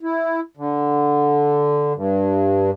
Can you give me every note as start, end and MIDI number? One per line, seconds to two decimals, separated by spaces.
0.03 0.40 64
0.57 1.93 50
1.95 2.71 43